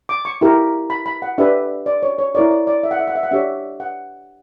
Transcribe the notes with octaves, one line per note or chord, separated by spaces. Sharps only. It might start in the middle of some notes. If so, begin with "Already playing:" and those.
D6
C#6
E4 G4 A#4
B5
B5
F#5
D4 G4 B4 E5
D5
C#5
C#5
E4 A#4 C#5 D5
D5
D5
E5
F#5
E5
F#5
E5
F#5
D4 G4 C#5 E5
F#5